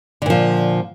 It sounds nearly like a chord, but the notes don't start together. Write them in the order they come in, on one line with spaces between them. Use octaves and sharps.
D3 A#2 F3